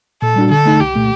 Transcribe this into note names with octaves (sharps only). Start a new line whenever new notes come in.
A#2 A4
G3 D4 F#4
D3 A4
A3 D#4
C2 G4
A#2 A3